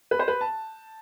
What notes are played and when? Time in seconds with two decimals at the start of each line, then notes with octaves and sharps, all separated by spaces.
0.11 B4
0.19 C5
0.28 B4
0.41 A5